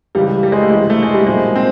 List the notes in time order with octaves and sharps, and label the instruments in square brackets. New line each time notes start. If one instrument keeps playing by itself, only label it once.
[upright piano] C#2 C#3 E3 G3
G3
G#3
A3
C#2 C3 E3 G#3
A3
G#3
G3
B1 A#2 F3 G#3
C4